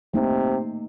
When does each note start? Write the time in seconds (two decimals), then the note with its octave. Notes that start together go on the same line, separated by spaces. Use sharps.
0.14 C3 A3 A#3 D#4